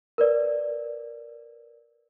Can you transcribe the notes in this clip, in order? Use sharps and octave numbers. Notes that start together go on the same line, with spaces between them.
A#4 B4 D5